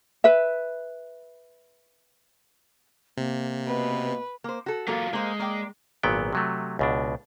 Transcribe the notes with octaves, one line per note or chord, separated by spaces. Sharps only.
B4 E5
C3 A#3
B2 B4
A#3 C5
F#4 A4
F#3 A#3 F4 A4
G#3 A#3 C5 F5
A#3 D5 G5
G#1 A#2 F#3 B3 G5
C3 F#3 A3
C#2 B2 D4